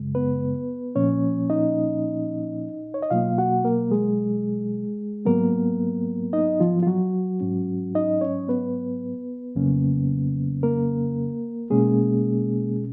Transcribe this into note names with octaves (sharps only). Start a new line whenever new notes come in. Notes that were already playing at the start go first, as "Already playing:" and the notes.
Already playing: F#2 C#3 G#3
B3 B4
A#2 F3 A#3 C#4 C#5
D#4 D#5
C#5
D#5
B2 F#3 A#3 F4 F5
F#4 F#5
A#3 A#4
G#3 G#4
G#2 F#3 A#3 B3 A#4
D#4 D#5
F3 F4
F4
F#3 F#4
G#2 F#3 C#4
D#4 D#5
C#4 C#5
B3 B4
F2 C#3 F#3 A#3 C#4
A#3 A#4
B2 G#3 A#3 C#4 G#4